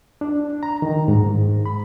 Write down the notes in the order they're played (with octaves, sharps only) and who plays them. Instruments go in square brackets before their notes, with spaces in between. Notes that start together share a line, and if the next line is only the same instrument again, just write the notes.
[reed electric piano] D4
A#5
D#3
G#2
B5